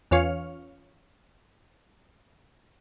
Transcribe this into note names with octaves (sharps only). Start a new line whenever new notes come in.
E2 C#4 F4 C#6 F6